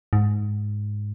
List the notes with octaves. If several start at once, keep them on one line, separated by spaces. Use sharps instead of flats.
G#2